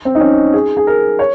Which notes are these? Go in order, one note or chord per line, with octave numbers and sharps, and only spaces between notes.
C4
D#4
C#4
G#4
G#4
A#4
C#5